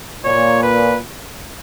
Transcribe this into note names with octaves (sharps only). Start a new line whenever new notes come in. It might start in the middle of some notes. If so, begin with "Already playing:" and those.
A#2 C#5
B4